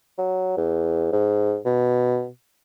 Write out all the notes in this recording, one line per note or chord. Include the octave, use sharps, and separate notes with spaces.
F#3
E2
G#2
B2